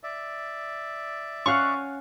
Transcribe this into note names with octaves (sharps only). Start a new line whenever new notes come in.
D5 E5
C#4 F5 F#5 C#6 F#6